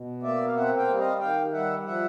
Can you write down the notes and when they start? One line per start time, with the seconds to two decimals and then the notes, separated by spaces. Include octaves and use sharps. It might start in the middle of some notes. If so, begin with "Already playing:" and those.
Already playing: B2
0.22 A#3 D5 E5
0.46 F5
0.55 C4 E5 F#5
0.77 F5 G5
0.88 G3
0.98 D#5 F5
1.20 D#3 F5 G5
1.52 G3 E5 F#5
1.85 F3 E5 F#5